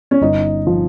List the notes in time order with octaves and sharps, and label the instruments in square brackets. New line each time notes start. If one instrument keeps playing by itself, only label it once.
[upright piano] C#4
[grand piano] G1 [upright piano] D#4
[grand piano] F3